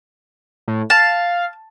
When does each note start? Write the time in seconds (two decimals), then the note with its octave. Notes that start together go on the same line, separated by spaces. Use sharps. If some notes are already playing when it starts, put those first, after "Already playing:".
0.68 A2
0.90 F5 A5